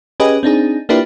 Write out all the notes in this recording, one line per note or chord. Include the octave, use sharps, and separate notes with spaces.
C#4 G4 G#4 B4 D#5
C4 D4 D#4 G#4
A#3 D4 E4 F4 G4 B4